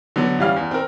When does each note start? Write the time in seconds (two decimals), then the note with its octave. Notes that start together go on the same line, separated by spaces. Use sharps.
0.16 D3 F#3 B3
0.38 A1 E3 G3 C#4 F5 F6
0.56 E2
0.71 C4 A#4